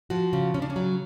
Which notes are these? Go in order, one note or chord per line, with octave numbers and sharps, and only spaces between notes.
F3 F#4
C#3
C#3 C#4
D4
C#4
F#3